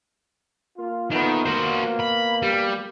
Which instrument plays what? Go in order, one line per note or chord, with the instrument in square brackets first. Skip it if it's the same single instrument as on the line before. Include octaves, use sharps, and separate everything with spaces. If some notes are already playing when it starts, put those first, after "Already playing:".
[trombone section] A#3 F4
[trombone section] A#2 A3 B3 [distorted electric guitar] D#3
[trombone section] B2 A#3 [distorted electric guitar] F#4 C5
[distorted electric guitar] B5
G3